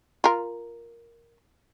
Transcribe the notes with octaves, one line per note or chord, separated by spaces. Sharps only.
F4 A#4